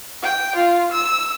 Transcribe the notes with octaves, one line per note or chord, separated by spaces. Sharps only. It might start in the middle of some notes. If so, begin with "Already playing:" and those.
G5
F4
E6